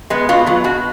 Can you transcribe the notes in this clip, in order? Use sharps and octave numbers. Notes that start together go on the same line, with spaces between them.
G#3 B3
B2 F4
F#3 B3
B2 F#4